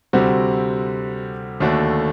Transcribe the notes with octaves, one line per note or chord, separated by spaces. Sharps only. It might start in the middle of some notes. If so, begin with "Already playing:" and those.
D2 C3 G3 C4 F#4
D#2 D3 A3 D4 F#4